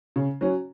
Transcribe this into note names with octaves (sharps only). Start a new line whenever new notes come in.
C#3
F#3 C#4